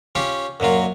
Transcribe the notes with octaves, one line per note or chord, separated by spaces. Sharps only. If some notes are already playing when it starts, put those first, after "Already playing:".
C#4 F4 G4
F#2 A#2 F#3 F4